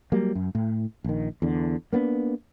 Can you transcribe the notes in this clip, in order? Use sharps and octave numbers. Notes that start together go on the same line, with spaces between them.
F#3 G3 A#3
F#2
A2
A#1 D#3
E2 D3
A#3 B3 C#4 D4